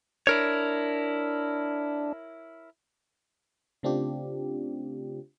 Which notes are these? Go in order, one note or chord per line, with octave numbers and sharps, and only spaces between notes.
D4 E4 A#4 C#5
C#3 A3 C4 D4 F4 G4